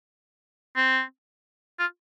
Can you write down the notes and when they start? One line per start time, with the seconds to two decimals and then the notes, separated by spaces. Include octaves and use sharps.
0.76 C4
1.79 F4